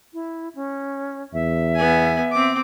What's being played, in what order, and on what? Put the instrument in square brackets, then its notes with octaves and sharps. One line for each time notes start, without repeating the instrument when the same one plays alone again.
[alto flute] E4
C#4
[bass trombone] E2 [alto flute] E5
[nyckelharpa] B3 G#5
C4 D6